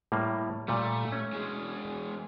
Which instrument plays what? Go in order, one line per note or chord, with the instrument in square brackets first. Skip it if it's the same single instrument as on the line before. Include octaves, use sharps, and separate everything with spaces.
[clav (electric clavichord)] A2 G3 A#3
[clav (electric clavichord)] A#2 G3 [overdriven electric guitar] A3
[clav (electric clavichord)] C#4
[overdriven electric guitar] E2 G#3